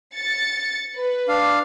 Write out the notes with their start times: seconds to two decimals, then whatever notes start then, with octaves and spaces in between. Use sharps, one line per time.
0.15 A6 C#7
0.97 B4
1.28 D4 F5